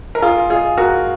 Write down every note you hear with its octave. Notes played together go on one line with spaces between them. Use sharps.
A#4
F4 G#4
F4 G#4
F#4 A#4